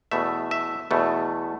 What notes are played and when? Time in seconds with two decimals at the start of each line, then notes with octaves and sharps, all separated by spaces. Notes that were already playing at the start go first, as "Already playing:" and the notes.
0.11 E2 B2 A3 E5
0.51 E5
0.91 E2 B2 A3